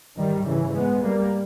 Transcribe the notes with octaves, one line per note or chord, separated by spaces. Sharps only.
G#2 D#3 G3
C#3 E3
G#3 B3
G3 A#3